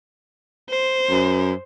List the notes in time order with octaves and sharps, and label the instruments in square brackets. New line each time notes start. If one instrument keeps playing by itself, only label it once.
[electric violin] C5
[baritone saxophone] F#2